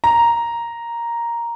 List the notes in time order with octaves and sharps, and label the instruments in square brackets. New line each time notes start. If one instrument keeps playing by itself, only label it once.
[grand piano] A#5